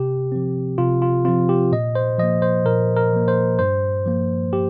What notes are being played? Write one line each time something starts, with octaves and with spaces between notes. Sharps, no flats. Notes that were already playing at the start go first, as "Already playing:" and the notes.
Already playing: C3 G4
F3 C4
C3 F4
F4
F3 C4 F4
G4
A#2 D#5
C5
F3 A#3 D#5
C5
A#2 A#4
A#4
F3 A#3
C5
G2 C5
F3 A#3
G4